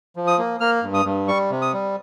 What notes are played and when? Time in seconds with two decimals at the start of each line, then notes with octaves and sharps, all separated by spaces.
0.16 F3
0.27 D#6
0.38 A#3
0.60 A#3 F6
0.83 G2
0.94 D#6
1.05 G2
1.28 G3 C#6
1.50 C3
1.62 D#6
1.73 G3